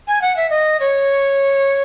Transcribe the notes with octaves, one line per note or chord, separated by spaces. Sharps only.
G#5
F#5
E5
D#5
C#5